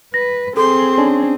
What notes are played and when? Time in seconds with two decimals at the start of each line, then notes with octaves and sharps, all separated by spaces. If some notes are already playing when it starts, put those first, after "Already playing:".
0.14 B4 A#6
0.57 C4 G#4 A4 C6
0.98 C#4 D4